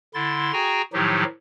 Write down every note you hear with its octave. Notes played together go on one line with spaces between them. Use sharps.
D3 E4 C6 A6
F#4 G#4 G5 G#5 A#5
A2 D#3 F3 F#3 D#4 G4